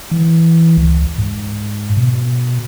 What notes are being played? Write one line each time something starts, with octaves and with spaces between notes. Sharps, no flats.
E3
C#2
G#2
B2